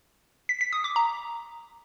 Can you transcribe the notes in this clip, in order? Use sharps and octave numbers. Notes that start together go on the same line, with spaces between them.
B6
B6
D#6
D6
A#5